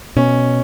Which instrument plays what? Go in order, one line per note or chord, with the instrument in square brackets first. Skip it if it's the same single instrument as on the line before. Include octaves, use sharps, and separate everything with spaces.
[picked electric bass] B2 [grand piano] C#4